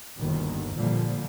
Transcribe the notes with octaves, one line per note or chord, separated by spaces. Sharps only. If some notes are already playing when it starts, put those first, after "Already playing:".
G1 D#2 B2 D#3
A#2 D3 F3 G3